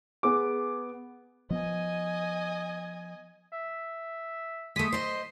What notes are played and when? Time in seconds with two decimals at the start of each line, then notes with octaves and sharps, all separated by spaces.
0.23 B3 G#4 D6
1.50 F3 B3 D#5 G#5
3.52 E5
4.76 G#3 A3 D#6 B6
4.92 C5 D#5 C6